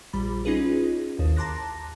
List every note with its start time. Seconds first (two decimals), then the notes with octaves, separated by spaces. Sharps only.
0.13 A#1 G3 B5
0.45 C#4 D#4 F4 G#4 B4
1.19 A1 D#2
1.37 A5 A#5 C6 D6 F#6 A#6